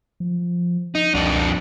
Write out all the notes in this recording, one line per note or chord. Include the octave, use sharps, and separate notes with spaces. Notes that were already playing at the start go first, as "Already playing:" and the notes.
F3
D#4
C2 F2 D4